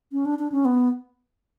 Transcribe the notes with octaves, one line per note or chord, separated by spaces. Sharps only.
C#4
D4
D4
C#4
B3